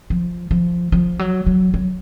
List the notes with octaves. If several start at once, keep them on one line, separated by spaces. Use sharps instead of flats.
F3
F3
F3
F#3
F#3
F#3